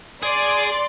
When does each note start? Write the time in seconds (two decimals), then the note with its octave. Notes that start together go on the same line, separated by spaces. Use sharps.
0.23 G#4 D5 C6